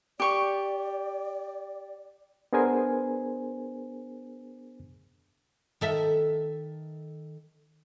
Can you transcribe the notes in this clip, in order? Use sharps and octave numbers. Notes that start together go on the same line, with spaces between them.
G4 D5 C#6
B3 D4 G#4 A#4 C5 G#5
D#3 A4 E5